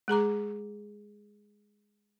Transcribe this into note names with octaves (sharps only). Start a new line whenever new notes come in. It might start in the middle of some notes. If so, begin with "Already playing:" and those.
G#3 G#4 A#5 D6